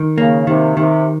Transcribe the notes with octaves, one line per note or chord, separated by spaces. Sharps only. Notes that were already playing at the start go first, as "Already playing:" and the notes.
Already playing: D#3
C#3 A#3
C3 D#3
C3 D#3